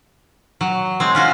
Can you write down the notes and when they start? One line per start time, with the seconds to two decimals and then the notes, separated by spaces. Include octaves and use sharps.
0.61 F#3
1.00 G#3 C4
1.15 C#4 F4 F#4